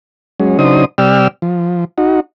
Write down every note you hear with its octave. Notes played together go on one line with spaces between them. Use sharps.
F#3 G#3 C#4
C#3 F#3 D4 D#4 C5 D#6
C3 G3 D5 G5 E6 F6
F3
D#4 F#4